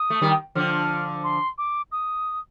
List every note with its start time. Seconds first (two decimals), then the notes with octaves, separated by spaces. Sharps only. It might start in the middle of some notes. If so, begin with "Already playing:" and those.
Already playing: D#6
0.10 A3
0.22 D#3 G3
0.55 D3 F3 F6
1.24 C6
1.58 D6
1.92 D#6